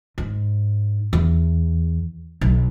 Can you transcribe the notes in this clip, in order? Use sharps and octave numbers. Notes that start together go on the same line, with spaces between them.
G#2
E2
B1